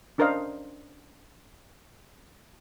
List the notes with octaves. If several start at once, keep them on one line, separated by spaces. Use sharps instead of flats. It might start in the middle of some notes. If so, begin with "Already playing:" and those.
C#4 D4 A#4 C5 D#5 F5